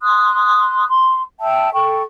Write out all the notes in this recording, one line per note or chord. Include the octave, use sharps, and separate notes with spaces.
C6 D#6 F#6
C6
E5 G5 A5 E6
A4 G5 C#6